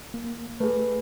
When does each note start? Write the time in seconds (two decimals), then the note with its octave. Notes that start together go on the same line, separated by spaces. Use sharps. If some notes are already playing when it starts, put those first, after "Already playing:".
0.14 A#3
0.60 A3 G#4 B4